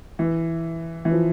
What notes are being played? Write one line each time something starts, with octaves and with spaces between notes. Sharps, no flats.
E3
E3
F3